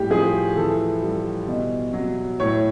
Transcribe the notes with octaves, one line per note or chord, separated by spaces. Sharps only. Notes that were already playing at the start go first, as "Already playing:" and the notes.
Already playing: A2 G3 G4
F3 G#4
E3 A4
G3
B2
F#3
A2 C#5